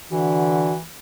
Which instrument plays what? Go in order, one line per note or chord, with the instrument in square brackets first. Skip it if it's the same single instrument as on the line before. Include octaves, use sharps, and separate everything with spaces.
[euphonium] D3 [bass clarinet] E3 [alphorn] F#4